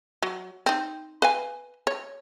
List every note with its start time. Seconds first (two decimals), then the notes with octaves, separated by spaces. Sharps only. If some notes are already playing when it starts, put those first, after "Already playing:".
0.22 F#3
0.66 C4 D#4
1.22 B4 F5 G#5
1.87 C#5